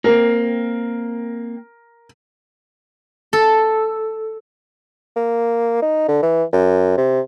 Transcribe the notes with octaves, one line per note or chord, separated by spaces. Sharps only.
A#3 C4 A#4
A4
A#3
D#4
D3
E3
F#2
C3